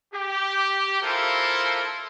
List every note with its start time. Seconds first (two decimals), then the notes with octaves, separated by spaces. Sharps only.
0.14 G4
1.02 A#3 E4 F4 A4 A#4 C5